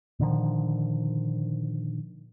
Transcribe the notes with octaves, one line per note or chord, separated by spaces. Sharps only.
A#2 D3 D#3 F3